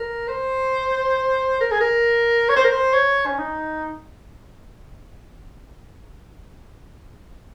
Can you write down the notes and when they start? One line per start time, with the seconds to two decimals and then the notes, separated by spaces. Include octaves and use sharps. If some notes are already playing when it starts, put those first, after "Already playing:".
Already playing: A#4
0.28 C5
1.61 A#4
1.71 G#4
1.81 A#4
2.49 C#5
2.56 C5
2.64 A#4
2.71 C5
2.93 C#5
3.26 C#4
3.38 D#4